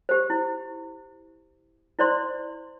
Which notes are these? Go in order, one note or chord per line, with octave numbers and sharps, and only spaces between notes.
G4 C5
E4
E4 C5 D5 C6